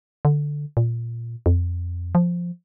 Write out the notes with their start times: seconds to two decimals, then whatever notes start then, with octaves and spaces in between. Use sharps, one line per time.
0.25 D3
0.77 A#2
1.46 F2
2.15 F3